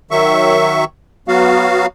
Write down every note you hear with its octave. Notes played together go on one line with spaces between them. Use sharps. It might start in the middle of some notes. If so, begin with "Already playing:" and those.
D#3 F#3 E5 C#6
F#3 B3 F#4 F5